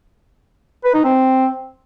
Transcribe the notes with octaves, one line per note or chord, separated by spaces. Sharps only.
B4
D#4
C4